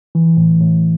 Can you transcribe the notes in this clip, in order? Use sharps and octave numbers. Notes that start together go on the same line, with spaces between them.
E3
A2
A2